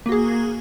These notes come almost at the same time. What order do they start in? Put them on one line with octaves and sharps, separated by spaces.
A#3 F#4 G#4